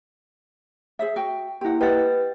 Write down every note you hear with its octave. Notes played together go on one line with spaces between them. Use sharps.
G#4 C5 E5
F#4 G5
A#3 E4 G4 F#5
G4 B4 D#5 F#5 A6